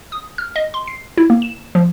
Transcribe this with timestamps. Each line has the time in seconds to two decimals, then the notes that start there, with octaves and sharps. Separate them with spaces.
0.12 D#6
0.38 F6
0.56 D#5
0.74 C6
0.88 C7
1.18 E4
1.30 A#3
1.42 E7
1.75 F3